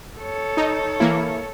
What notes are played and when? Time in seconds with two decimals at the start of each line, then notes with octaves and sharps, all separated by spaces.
0.18 A4 C#5
0.57 D#4
1.00 E3 A#3 E4